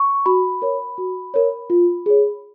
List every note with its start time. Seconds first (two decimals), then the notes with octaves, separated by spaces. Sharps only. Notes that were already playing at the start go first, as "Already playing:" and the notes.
Already playing: C#6
0.26 F#4 B5
0.62 A#4 C#5
0.98 F#4
1.34 A#4 C#5
1.70 F4
2.06 G#4 C#5